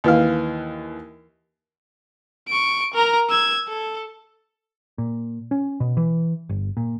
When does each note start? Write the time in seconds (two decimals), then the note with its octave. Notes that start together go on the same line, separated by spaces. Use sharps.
0.04 D#2 E3 F5
2.48 C#6 D7
2.94 A#4 A#5
3.30 E6 G#6
3.68 A4
4.98 A#2
5.51 C#4
5.80 B2
5.97 E3
6.49 G1
6.77 A#2